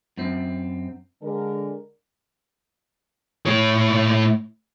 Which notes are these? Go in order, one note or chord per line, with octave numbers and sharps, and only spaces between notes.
F#2 C4
D3 G#3 A#4
A2 C#5